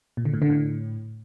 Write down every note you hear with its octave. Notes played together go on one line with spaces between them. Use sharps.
A#2
D3
A2
D3
A2